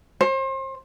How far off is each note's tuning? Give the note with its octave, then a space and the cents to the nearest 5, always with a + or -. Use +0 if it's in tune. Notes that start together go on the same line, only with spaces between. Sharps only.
C5 +35